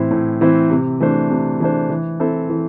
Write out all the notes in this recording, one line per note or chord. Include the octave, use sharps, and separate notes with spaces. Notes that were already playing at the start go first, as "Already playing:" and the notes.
Already playing: A2 E3 C4 E4 C5
A2
E3 C4 E4 C5
C3
E3 A3 D4 C5
C3
E3 A3 D4 C5
E3
C4 E4 A4 C5
E3